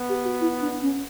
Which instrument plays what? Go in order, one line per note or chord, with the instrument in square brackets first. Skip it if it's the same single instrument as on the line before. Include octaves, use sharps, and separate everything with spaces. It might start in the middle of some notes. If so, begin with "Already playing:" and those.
Already playing: [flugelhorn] B3
[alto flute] G4
F#4
E4
D4
C#4